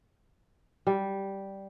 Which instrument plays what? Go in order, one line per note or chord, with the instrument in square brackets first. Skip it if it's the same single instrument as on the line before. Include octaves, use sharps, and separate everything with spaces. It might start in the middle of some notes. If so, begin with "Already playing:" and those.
[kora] G3